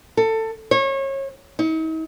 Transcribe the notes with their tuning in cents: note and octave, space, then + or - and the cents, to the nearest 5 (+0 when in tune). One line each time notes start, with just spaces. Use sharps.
A4 +20
C#5 -30
D#4 +45